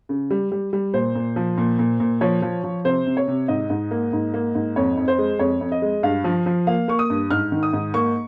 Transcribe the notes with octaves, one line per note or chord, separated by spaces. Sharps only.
C#3
G3
G3
G3
A#2 C5
A#2
F3
A#2
A#2
A#2
F3 C#5
F3
F3
C3 C5
C3
C#5
C3
G#2 D#5
G#2
A#3
G#2
A#3
G#2
F2 C#5
F2
C5
G#3
F2 C#5
F2
D#5
G#3
G2 F5
F3
F3
A#3 F5
A#3 C#6
D#6
G2
G#2 F6
D#3
D#6
G#2
A#3 C#6